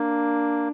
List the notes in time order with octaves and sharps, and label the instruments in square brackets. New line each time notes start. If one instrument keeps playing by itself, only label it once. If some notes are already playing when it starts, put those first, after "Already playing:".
Already playing: [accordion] A#3 [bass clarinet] D4